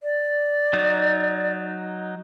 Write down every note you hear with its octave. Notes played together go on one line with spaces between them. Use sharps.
D5
F#3 D#4